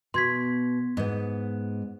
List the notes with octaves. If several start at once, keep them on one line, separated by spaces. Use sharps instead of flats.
B2 C6 G#6 B6
G#2 B3